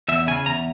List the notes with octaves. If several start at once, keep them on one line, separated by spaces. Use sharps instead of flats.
E2 E5
C#3 G#5
E2 A#5